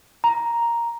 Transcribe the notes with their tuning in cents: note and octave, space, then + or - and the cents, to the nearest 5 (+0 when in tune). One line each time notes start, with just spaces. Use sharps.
A#5 +5